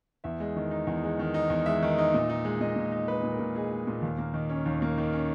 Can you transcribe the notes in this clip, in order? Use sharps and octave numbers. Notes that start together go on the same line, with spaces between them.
E2 E5
G#3
D#3
D#4
E2
G#3
D#3
D#4
E2
G#3 E5
D#3
D#4
A#2
D#4
G#3
A#2 D#5
A#2
D#4
G#3 B4
A#2
A#4
A#2
D#4 G#4
G#3
A#2
D#2
A#3
D#3
C#4
D#2
A#3
D#3
C#4